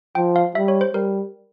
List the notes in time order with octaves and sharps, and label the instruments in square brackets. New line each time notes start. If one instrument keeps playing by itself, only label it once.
[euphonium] F3 [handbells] G5
[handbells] F5
[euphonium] G3 [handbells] E5
[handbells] C#5
C5
[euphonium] G3 [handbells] A#4